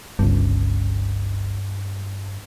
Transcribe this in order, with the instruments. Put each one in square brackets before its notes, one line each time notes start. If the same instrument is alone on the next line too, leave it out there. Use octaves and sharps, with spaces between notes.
[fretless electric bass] G1 C#2 [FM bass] G2